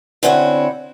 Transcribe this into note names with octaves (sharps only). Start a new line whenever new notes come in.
D3 C4 C#4 E4 F#4 C#5